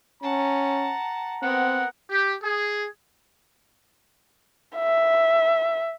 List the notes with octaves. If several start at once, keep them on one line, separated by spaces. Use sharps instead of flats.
C#4 F#5 A5 A#5
B3 C4 A#4 F#5
G4
G#4
E5